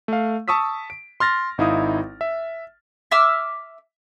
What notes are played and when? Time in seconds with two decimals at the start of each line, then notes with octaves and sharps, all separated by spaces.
0.08 A3 F5
0.48 A5 C#6 D#6 E6 B6
0.90 D7
1.20 C6 F6 A6 A#6
1.58 G#1 D#4 E4 F5 D#6
2.21 E5
3.11 E5 D6 E6 F6